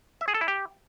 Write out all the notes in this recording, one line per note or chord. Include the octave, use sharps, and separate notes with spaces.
E5
G#4
A4
E4
G4